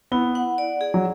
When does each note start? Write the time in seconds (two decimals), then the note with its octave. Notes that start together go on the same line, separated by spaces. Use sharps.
0.12 B3 E4
0.35 F#5
0.58 D5
0.81 G#4
0.94 F#3